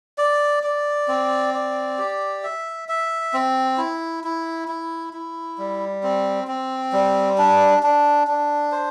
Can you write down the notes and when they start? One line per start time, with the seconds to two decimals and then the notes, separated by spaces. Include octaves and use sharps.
0.18 D5
0.63 D5
1.08 C4
1.54 D5
1.98 G4
2.43 E5
2.89 E5
3.34 C4
3.78 E4
4.24 E4
4.68 E4
5.13 E4
5.58 G3
6.03 C4
6.48 C4
6.93 G3
7.38 D4
7.83 D4
8.27 D4
8.72 C5